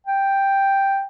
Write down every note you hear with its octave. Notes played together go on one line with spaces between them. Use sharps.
G5